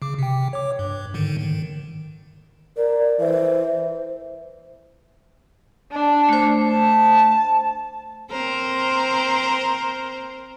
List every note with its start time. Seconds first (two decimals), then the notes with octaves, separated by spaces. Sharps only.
0.02 C#3 D6
0.19 C3 G5
0.53 C#5 D6
0.79 G2
1.14 G#2 D3 D#3
1.40 D#3
2.77 A#4 D5
3.20 E3 C5
5.92 D4
6.29 A3 C5
6.70 A5
8.31 C4 A#4 C5